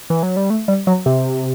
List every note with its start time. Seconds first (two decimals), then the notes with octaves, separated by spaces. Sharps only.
0.10 E3
0.23 F#3
0.37 G3
0.50 A3
0.68 G3
0.87 F#3
1.06 C3